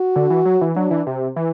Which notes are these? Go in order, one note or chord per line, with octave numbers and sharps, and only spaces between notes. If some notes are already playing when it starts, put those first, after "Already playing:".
Already playing: F#4
D3
E3
F#3
E3
F#3 D4
E3
C3
E3